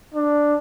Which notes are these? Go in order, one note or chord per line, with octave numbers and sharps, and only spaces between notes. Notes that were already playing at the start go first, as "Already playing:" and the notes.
D4